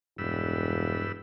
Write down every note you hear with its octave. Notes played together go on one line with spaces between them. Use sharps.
E1 G2 B4 E6